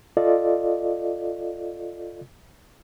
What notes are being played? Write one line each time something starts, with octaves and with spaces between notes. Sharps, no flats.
F4 A4 D5 D#5 F5